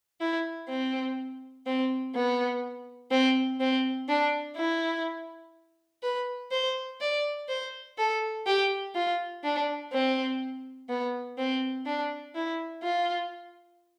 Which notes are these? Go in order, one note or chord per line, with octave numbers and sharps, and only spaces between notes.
E4
C4
C4
B3
C4
C4
D4
E4
B4
C5
D5
C5
A4
G4
F4
D4
C4
B3
C4
D4
E4
F4